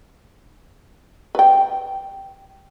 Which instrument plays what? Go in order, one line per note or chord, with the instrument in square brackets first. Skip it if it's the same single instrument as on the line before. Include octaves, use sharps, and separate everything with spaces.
[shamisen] B4 G5